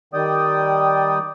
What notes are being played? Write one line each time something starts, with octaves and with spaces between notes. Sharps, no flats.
D#3 G3 D5 G5 D#6